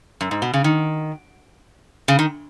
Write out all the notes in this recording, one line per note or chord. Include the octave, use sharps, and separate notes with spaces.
F#2
G#2
B2
C#3
D#3
C#3
D#3